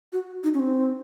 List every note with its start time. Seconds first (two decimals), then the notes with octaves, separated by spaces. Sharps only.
0.12 F#4
0.44 D#4
0.54 C#4
0.59 C4